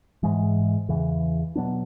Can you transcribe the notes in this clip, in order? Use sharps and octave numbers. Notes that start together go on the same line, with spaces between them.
G#2 E3 G#3
E2 C#3 E3
B2 F#3 B3 D4